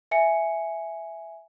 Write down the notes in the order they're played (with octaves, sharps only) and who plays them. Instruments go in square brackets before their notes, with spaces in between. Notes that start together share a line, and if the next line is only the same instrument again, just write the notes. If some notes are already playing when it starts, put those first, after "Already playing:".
[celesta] E5 G#5 C#7